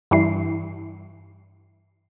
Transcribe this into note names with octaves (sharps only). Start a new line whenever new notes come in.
G2 E3 C7